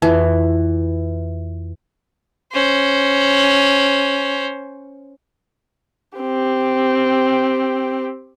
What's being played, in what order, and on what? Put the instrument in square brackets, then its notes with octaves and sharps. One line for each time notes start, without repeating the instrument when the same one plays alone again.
[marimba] F2 [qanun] E3
[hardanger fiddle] C#4 C5
[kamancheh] C4 G4